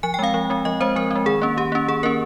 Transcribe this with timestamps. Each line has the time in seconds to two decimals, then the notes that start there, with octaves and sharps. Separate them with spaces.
0.03 F3 G#5
0.14 G5
0.19 G#3 C4 F5
0.34 F3
0.50 G#3 C4
0.65 F3 D#5
0.80 G#3 C4 C5
0.96 F3 A#4
1.11 G#3 C4
1.26 D#3 G#4
1.42 A#3 C#4
1.57 D#3 G4
1.72 A#3 C#4
1.88 D#3 G#4
2.03 A#3 C#4 A#4